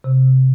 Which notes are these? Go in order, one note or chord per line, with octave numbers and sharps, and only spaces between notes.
C3